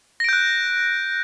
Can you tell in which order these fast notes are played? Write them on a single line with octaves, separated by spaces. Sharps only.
A#6 D7 G6 F#6